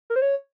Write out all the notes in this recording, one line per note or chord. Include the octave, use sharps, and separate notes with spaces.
A#4
C5
C#5